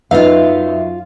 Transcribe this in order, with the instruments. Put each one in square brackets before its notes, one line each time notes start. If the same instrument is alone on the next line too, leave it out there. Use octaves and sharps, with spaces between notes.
[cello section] F#2 [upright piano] B3 D#4 [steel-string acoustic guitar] F4 F5 [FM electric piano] E5